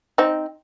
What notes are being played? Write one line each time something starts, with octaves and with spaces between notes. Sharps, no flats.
C4 D#4